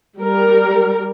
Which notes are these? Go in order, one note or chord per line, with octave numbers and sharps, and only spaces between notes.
G3 A#4